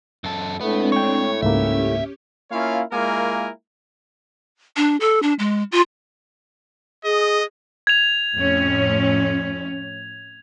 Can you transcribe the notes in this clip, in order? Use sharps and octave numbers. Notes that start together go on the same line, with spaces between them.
F#2 A4
A2 G#3 A3 B3 C4 D4
C#5 G5 C#6
C#2 G#2 A#3 C#4 G4 E5
A#3 C#4 E4 F4 C#5 F5
G#3 A#3 E4 F4 A#4 G#5
D4
A4
D4
G#3
F4
G#4 D#5
G#6 F7
F2 A2 C#4